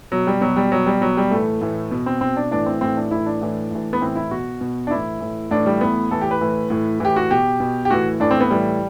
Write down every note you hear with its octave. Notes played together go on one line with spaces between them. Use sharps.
B2 F#3
G3
B2 F#3
G3
B2 F#3
G3
B2 F#3
G3
A2 E3 A3
A2 E3
B2
C4
B2 C4
D4
A2 E3 D4
C4
A2 E3 C4
D4
A2 E3 E4
D4
A2 E3
A2 E3
B3
A2 E3 C4
E4
B2 F#4
B2
D4
A2 E3 E4
A2 E3
A2 E3 D4
G3
A2 E3 B3
A2 E3 A4
G4
B4
A2 E3
A2 E3
A2 E3 G4
F#4
B2 G4
B2
G4
A2 E3 F#4
A2 E3 D4
C4
B3
A2 E3 G3